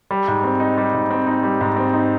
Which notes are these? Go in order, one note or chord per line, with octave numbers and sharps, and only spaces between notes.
G3
G#2
C4
D#4
G3
G#2
C4
D#4
G3
G#2
C4
D#4